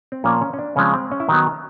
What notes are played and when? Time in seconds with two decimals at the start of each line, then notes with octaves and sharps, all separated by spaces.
0.12 C4
0.24 A#2 F3 A#3 C#4
0.41 C#4
0.53 C#4
0.59 D4
0.76 C#3 F3 G#3 C4 C#4
0.94 C4
1.12 C#4
1.20 E4
1.29 D#3 F#3 B3 D#4